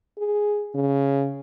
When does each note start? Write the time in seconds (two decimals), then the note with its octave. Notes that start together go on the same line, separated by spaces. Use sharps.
0.18 G#4
0.75 C#3